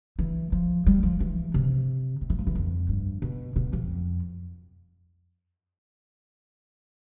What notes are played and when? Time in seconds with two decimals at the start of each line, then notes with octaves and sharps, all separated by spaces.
0.19 E3
0.52 F3
0.86 G3
1.03 F3
1.20 E3
1.54 C3
2.21 C3
2.30 E3
2.39 F3
2.47 E3
2.55 F2
2.89 G2
3.22 B2
3.56 B2
3.73 F2